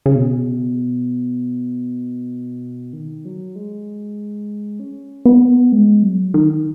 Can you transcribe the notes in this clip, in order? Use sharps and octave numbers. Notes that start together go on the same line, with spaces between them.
C#3
B2
D#3
F#3
G#3
C#4
B3
G#3
F#3
D#3